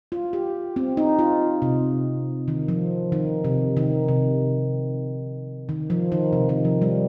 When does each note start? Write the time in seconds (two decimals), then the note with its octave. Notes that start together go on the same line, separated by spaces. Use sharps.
0.12 F4
0.33 G4
0.76 C4
0.97 D#4
1.19 F4
1.62 C3
2.48 D#3
2.68 F3
3.12 D#3
3.44 C3
3.77 D#3
4.08 C3
5.69 D#3
5.90 F3
6.12 D#3
6.33 C3
6.49 D#3
6.65 F3
6.82 G3